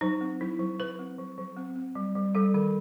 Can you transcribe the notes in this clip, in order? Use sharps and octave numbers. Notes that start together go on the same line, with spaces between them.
F#3 D#4
C4
F#3 E4
F#3
F#3 B4
C4
F#3
F#3
C4
C4
G3
G3
G3 A4
D#3 A4